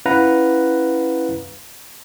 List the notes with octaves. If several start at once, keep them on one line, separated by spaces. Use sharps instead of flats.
C#4 E4 B4 F5 F#5 A#5